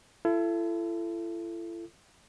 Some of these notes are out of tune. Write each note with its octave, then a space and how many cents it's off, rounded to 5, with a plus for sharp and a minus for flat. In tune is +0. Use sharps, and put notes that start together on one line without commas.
E4 +40 A4 +0